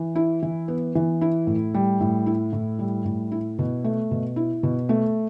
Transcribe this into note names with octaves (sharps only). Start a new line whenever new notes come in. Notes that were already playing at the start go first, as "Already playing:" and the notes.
Already playing: E3
E4
E3
B3
E3
E4
A2
G3
A2
E4
A2
G3
A2
E4
B2
A3
B2
E4
B2
A3